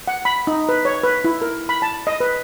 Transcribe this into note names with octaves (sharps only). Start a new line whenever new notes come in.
F#5
B5
D#4
B4
C#5
B4
E4
A#4
B5
A5
D#5
B4